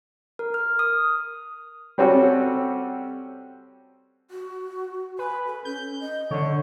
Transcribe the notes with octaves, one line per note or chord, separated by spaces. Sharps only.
A#4
F6
D#6
G3 C4 C#4 F#4 A4
F#4
B4 G#5
A4
C#4 G6
D#5
D3 C#5